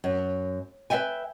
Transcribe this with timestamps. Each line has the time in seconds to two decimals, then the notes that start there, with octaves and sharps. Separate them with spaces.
0.04 F#2
0.90 B4 D5 E5 G5 G#5